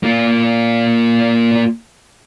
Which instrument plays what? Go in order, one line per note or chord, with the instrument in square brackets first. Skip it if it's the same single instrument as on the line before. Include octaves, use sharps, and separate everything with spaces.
[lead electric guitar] A#3 F4